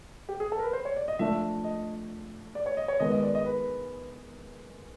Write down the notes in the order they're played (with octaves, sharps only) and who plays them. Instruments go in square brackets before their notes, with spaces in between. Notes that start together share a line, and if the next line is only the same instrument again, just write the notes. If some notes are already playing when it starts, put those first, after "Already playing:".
[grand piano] G4
G#4
A4
A#4
B4
C5
C#5
D5
D#5
[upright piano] F3 A3 D4 [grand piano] E5
[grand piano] D#5
D5
C#5
D#5
C#5
[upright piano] D#3 G#3 B3 [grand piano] D#5
[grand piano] D#5
D5
D#5
B4